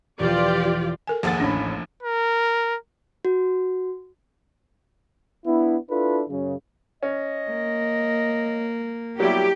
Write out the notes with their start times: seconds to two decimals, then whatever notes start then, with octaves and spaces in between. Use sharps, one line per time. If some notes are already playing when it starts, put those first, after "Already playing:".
0.19 E1 F3 F4 G4 D5
1.07 A4 A#4 G#5
1.23 F1 A#1 D#2 G#4 F#5 A6
1.40 A1 C#4 D4 B5
2.03 A#4
3.25 F#4
5.46 B3 D4 E4
5.90 D4 E4 F4 A4 B4
6.29 F#2 C#3
7.03 C#4 D#5
7.51 A#3
9.20 F#3 G3 B3 E4 G4